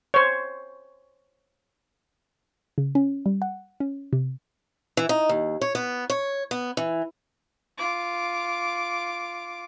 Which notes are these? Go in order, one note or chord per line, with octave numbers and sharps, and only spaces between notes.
C5 C#5
C#3
C#4
G3
F#5
C#4
C3
E3
D#4
D#2
C#5
B3
C#5
B3
E3
F4 D6